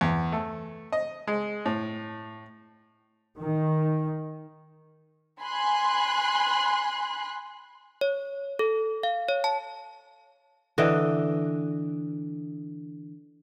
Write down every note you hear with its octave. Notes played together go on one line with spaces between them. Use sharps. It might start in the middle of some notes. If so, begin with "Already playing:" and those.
E2
A3
D#5
G#3
A2
D#3
G#5 B5 C6 F#6
C#5
A4
F5
C#5
A5
D3 E3 D#5 G5